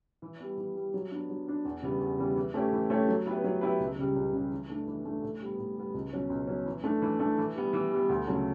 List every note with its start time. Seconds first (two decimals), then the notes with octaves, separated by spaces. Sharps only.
0.22 E3
0.40 G3 B3
0.57 E3
0.75 G3 B3
0.94 F#3
1.11 B3 D4
1.29 F#3
1.47 B3 D4
1.65 E2
1.82 C#3 E3 G3 B3
2.00 E2
2.18 C#3 E3 G3 B3
2.36 E3
2.54 A3 C#4 G4 C#5
2.72 E3
2.90 A3 C#4 G4 C#5
3.08 F#3
3.26 B3 E4 G4 B4
3.44 F#3
3.61 B3 E4 G4 B4
3.80 C#2
3.98 C#3 G3
4.16 C#2
4.33 C#3 G3
4.51 E3
4.70 A3 D4
4.87 E3
5.05 A3 D4
5.22 A2
5.41 G3 B3
5.58 A2
5.77 G3 B3
5.94 C#2
6.13 B2 F#3 C#4
6.30 C#2
6.48 B2 F#3 C#4
6.66 E3
6.84 A3 D4
7.02 E3
7.19 A3 D4
7.38 E3
7.56 G3 B3
7.73 E3
7.92 G3 B3
8.09 D2
8.27 C#3 F#3 A3